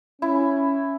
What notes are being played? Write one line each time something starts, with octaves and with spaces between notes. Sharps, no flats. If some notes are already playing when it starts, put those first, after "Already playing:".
C#4 E4